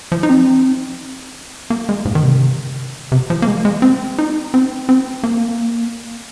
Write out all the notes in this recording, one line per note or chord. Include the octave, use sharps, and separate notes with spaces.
F3
D#4
C4
A#3
G#3
G#2
D#3
C3
C3
F3
A#3
G#3
G#3
C4
D#4
C4
C4
A#3